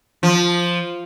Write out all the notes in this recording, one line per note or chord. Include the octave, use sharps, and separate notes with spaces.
F3